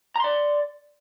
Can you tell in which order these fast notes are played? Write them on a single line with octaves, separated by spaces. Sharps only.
A#5 C6 D5